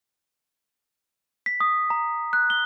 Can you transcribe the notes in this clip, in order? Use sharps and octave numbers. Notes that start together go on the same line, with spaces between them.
B6
D#6
A#5
F#6
G7